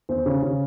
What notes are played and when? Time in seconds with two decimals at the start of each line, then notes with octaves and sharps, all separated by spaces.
0.09 E2 C5
0.26 C#3
0.42 C#3